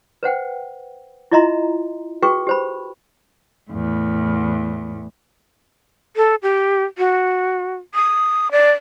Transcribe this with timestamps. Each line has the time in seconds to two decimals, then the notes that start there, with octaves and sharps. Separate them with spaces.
0.23 B4 C5 F#5 G5
1.32 E4 F4 D#5 E5 A#5 C6
2.23 F#4 G#4 B4 G5 C#6
2.47 G4 C5 B5
3.69 E2 A2
6.16 A4
6.43 G4
6.98 F#4
7.95 D#6
8.52 D5